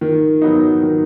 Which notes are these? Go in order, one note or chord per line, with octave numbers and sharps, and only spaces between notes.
D#3
F#3 B3 D#4
D#3